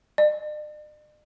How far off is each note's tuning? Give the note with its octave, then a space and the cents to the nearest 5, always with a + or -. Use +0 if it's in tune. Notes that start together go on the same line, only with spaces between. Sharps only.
D5 +45